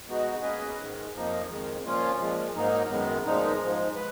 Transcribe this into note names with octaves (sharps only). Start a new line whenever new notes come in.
B2 G#3 B3 D#4 F#4
A#3 C#4 G#4 B4 D#5
G#2 D#3 G#3
F2 F3 A#3 D#4
F2 D#3 G#3
A#2 F3 A#3 C#4 F4
A#2 F3 G#3
G#2 F#3 A#3 D#4
F#2 D#3 G#3 B3
A#2 F3 G#3 D#4
G#2 F3 G#3
B4